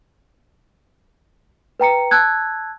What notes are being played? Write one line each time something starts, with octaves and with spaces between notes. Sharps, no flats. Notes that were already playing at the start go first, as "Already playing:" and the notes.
B4 G5 A#5 C#7
A5 E6 F#6 G#6